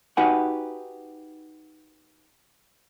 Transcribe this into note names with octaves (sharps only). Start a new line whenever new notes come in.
D#4 F#4 G4 B4 F#5 G#5